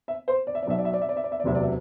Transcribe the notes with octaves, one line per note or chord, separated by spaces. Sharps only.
E5
C5
D5
E5
D5
B1 B2 F#3 E5
D5
E5
D5
E5
D5
E5
D5
E5
D5
E1 D2 C3 F#3 E5
D5
E5